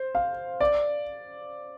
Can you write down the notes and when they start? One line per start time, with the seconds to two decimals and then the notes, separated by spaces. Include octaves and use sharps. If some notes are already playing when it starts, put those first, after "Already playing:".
Already playing: C5
0.15 F5
0.61 D5